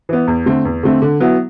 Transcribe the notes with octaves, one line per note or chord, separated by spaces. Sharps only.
E3 B3
E2
D3 A3 C4
E2
D3 A3 C4
D3
F#3 B3 E4